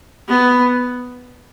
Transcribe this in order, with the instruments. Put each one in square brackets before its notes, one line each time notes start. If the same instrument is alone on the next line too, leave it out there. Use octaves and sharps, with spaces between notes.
[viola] B3